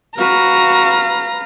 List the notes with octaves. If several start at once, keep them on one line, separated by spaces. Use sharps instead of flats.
F#4 B4 F5 A#5